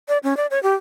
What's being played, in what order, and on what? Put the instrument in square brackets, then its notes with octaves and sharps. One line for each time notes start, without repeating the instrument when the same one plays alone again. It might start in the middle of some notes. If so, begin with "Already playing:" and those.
[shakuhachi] D5
C#4
D5
C#5
G4